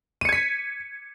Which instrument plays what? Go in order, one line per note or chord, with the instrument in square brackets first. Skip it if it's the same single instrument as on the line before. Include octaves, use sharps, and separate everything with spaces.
[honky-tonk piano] D#7
C#7
G#6
B6